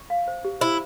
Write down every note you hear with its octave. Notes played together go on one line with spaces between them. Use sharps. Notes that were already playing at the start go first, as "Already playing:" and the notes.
Already playing: C#6
F5
C5
G4
E4 C5